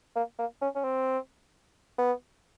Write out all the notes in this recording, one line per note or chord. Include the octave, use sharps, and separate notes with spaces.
A#3
A#3
C#4
C#4
C4
B3